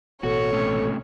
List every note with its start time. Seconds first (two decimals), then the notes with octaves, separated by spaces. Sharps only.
0.23 A1 B2 F#4 A4 C#5
0.53 C3 A3 C#4